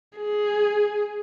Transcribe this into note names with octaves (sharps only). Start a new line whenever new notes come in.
G#4